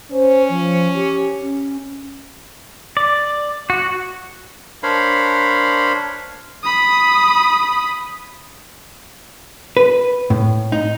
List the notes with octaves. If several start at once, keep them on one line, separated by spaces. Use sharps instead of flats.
C#4 C5
F3
G4
C#4
D5
F#4
D4 A#4 C5 C#5 F5 B5
B5 D#6
B4
A2
D#4